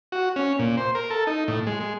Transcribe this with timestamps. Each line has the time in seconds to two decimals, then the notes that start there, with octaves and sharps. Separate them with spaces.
0.12 F#4
0.36 C#4
0.59 A#2
0.77 C5
0.95 A#4
1.10 A4
1.27 D#4
1.48 A2
1.67 G#3
1.80 G#3